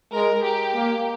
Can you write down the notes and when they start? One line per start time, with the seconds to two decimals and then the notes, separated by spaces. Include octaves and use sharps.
0.13 G#3 A#4
0.44 G4
0.75 A#3